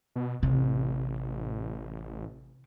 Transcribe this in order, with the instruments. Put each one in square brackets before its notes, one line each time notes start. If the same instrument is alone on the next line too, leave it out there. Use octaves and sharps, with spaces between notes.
[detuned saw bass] B2
[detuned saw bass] A1 [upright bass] C3